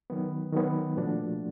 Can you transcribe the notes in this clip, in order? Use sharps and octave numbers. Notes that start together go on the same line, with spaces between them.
D#3 F#3 B3
D#3 F#3 B3
A#2 F3 A3 D4 F#4